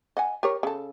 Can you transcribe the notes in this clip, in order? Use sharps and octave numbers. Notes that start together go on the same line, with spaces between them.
D#5 F#5 G#5
G4 A#4 C#5
C#3 A4